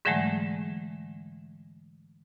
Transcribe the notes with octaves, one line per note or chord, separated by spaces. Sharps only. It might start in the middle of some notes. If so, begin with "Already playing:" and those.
G#2 D3 E3 F#3 G#3 A3